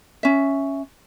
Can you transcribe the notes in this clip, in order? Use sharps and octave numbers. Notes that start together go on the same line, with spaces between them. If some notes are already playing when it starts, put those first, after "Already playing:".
C#4 E5